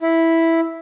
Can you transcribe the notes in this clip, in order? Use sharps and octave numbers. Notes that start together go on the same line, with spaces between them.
E4